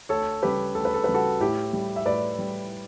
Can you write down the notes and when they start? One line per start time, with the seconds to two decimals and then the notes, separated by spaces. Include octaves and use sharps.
0.09 D2 A4 C#5
0.43 C#3 G3 G4 B4
0.75 D2 A4
0.85 B4
0.94 A4
1.04 C#3 G3 B4
1.14 F#4 A4
1.40 A2 E4 G4
1.73 G3
1.96 E5
2.05 A2 B4 D5
2.39 G3